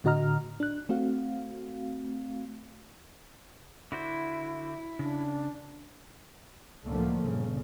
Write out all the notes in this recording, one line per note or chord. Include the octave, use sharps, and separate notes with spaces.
A2 D3 F#4 D#5 A#5 F6
D4 F#6
A3 C4 F#4 F5
D3 E4 F#4 C5
C#3 D4
C#2 A2 D3 F3 A3 A#3
G1 A#2 C#3